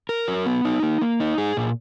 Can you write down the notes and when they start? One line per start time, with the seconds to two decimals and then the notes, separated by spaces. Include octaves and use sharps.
0.09 A#4
0.28 F#3
0.46 B3
0.65 D#4
0.83 A#3
1.01 A#3
1.20 D#4
1.38 G#4
1.57 A#2